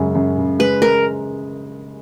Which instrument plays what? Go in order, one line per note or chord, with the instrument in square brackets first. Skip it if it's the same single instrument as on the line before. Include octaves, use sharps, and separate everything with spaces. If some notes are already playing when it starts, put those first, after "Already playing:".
Already playing: [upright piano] F#2 C#3 G#3
F#2
C#3
[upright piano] G#3 [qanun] B4
[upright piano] G#3 [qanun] A#4